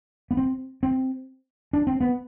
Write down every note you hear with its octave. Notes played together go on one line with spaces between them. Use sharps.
B3
C4
C4
D4
C4
B3